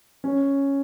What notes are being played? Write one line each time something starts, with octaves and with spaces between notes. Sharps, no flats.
C#4